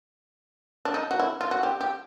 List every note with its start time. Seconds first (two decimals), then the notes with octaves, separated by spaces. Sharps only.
0.85 D4
0.94 D#4
1.11 F#4
1.20 E4
1.41 F4
1.51 F#4
1.63 G4
1.81 G4